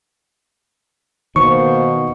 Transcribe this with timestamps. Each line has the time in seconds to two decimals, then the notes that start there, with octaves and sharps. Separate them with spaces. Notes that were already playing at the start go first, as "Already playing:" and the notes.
1.36 B2 D#3 A#3 C5 C#6